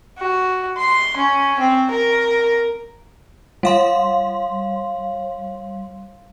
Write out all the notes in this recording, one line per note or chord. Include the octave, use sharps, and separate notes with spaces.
F#4
C6
C#4
C4
A#4
G3 F5 C6